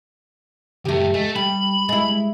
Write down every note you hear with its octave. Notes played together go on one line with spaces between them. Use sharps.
C#2 F#2 A3 G4
G#3 A3
G3 B5
G#3 E4